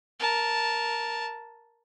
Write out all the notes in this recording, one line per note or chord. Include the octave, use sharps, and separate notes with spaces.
A#4 A5